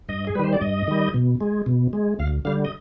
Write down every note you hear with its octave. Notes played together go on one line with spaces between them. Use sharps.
G2 D#5
G#4
D#3 G3 B4 C5
D5
G2 D#5
D#3 G3
B2
G#3
B2
G#3
D2 F5
D3 G3 F5
D#5